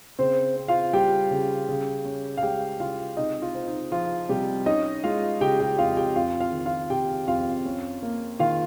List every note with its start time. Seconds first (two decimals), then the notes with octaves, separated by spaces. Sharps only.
0.19 C#3 C4 C5
0.56 C4
0.68 F4 F5
0.93 G3 G4 G5
1.31 C#3
1.69 C#3
2.05 C#4
2.37 F5
2.42 G#3 G4 G5
2.80 C#3 F4 F5
3.17 C3 D#4 D#5
3.42 F4
3.55 C4
3.68 D#4
3.92 F3 F4
4.29 C3 G3 G4
4.66 C#4 D#4 D#5
5.04 G#3 F4 F5
5.41 C#3 G4 G5
5.60 G4 G5
5.78 F2 F4 F5
5.97 G4 G5
6.16 F2 F4 F5
6.40 F4 F5
6.53 D#3
6.66 F4 F5
6.90 C3 G4 G5
7.27 F2 F4 F5
7.65 C#4
8.03 A#3
8.39 D#3 F4 F5